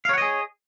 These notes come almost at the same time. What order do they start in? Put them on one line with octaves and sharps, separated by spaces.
F5 C#5 F#5 D#5 G#4